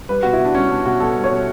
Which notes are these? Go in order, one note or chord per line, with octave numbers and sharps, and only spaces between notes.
G3 B4
B2 F#4
E4
B2
D4
G3 C#4
B2 D4
B2 F#4
B2 A4
G3
C#5
B2